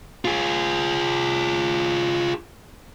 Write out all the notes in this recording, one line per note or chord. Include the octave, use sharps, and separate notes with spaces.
F4 G#4